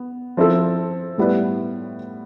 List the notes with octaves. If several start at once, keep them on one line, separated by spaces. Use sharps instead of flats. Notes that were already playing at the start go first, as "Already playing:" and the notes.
Already playing: B3
F3 C4 E4 A4
A2 G3 B3 E4 B4